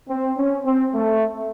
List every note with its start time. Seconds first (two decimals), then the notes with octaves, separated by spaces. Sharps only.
0.09 C4
0.38 C#4
0.65 C4
0.94 A3